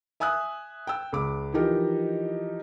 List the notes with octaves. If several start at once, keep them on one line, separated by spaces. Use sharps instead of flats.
E5 G#5 D#6 E6 F#6
G5 E6
C#2 D6
E3 F3 D#4 G4 A#4